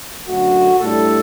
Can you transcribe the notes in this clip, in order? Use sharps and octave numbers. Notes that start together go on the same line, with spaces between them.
F#2 D3 F#3 A3 F#4
A2 G3 A3 D4 A4